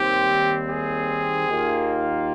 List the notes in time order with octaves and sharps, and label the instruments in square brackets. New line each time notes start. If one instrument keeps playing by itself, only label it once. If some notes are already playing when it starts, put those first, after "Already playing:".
Already playing: [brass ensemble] D#2 D#3 G3 C4 [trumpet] G4
[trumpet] G#4
[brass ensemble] D#2 D#3 A#3 F4